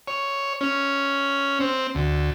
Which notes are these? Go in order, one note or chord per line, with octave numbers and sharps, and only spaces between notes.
C#5
C#4
C4
D2